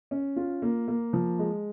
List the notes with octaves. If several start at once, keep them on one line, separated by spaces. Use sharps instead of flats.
C#4
F4
A#3
A#3
F3
G#3